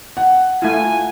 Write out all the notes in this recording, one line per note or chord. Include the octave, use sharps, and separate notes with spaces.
F#5
A3 E4 F4 G#5